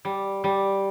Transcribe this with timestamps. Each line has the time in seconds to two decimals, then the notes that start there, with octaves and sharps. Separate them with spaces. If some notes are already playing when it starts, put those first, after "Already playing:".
0.05 G3
0.44 G3